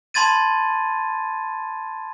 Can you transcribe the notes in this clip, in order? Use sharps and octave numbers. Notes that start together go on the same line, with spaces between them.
A5 B5 C6 G#6 A6 D#7